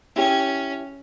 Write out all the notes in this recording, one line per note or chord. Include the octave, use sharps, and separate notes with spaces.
C#4 E4 G4